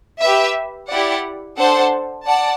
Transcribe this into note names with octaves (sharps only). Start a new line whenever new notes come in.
G4 B4 E5
E4 G4 D5 F#5
D4 A4 C5 F#5 A5
D5 F#5 A5